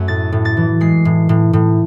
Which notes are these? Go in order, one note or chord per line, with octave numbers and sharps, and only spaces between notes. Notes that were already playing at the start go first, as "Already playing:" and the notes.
Already playing: F#2 A3
A2 A6
A2
A6
E3
G#3 C7
A2
A2
A2